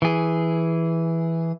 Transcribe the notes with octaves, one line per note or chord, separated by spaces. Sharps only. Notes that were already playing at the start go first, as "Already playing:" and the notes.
E3 G#4